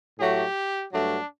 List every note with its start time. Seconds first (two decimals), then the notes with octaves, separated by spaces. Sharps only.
0.18 A2 F#3 A3 G4
0.92 G2 F#3 A3 D4